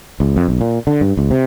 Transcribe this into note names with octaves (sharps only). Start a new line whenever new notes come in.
C#2
F2
B1
A#2
D3
G2
C#2
C3